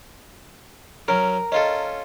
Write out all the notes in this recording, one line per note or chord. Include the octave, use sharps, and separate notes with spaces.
F#3 C#4 A#4
C#4 F4 A4 D#5